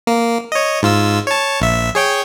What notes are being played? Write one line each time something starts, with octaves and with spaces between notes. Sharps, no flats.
A#3
C#5 D#5
G#2 F4 E6
C#5 A5
A#1 E5
G#4 C#5 G5